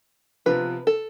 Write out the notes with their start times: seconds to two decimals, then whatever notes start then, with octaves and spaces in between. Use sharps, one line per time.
0.46 C3 F3 B3 F4 B4
0.87 A4